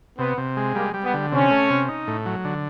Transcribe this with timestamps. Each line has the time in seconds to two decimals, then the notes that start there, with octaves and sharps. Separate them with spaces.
0.18 C3 B3
0.38 C3
0.57 G#3
0.75 G3 A#3
0.94 G3
1.04 B3
1.14 D3
1.32 C3 C#4
1.51 A3
1.70 C3
1.89 D#4
2.07 A2
2.26 F#3
2.45 D3